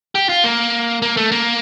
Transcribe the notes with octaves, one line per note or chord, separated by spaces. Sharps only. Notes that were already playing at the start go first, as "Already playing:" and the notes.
G4
F4
A#3
A#3
A3
A#3